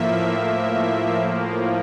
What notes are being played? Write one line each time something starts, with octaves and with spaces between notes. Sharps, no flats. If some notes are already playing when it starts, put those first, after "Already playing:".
Already playing: A2 F3 A#3 E5